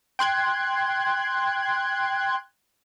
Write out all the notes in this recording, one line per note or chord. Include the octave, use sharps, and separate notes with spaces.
G5 C6 F#6 G#6